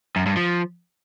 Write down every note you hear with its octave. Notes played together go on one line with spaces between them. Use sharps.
F#2
G2
F3